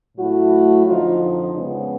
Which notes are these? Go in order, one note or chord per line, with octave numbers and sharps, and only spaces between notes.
A2 F#3 A3 E4 F#4
F2 D3 F3 D#4 F4
D#4 F4
C#3 F3 G#3 B3